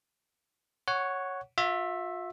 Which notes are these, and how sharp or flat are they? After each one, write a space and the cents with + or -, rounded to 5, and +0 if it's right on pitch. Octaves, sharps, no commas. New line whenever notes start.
C#5 +0 F#5 +0 C#6 +30
F4 +40 E5 +0